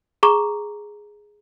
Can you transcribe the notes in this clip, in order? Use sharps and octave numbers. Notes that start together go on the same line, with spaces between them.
G#4 A#5 C#6 D6